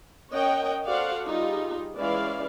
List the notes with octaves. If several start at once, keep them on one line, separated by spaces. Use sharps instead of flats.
C#4 A#4 C#5 D#5 F#5 G5
F#4 A4 C5 D5 F5 F#5
G3 D#4 F4 G#4
E3 G#3 C#4 E4 D5 F5